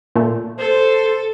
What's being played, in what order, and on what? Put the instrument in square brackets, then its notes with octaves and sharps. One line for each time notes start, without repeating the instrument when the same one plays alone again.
[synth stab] A#2 A3
[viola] A4 [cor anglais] C5